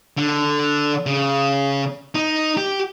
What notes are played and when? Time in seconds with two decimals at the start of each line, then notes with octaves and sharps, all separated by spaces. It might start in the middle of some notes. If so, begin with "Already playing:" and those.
0.17 D3
1.06 C#3
2.15 D#4
2.57 G4